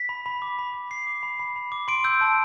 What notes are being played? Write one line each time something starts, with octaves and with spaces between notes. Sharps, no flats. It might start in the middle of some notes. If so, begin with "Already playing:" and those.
Already playing: B6
B5
B5
D6
B5
B5
B5 C7
D6
B5
B5
B5
D6
C6 D7
E6 G6
A5